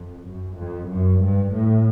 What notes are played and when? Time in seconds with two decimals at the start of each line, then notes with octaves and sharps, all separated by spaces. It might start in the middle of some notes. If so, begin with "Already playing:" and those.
Already playing: F2
0.26 F#2
0.56 F2
0.89 F#2
1.21 G2
1.52 A2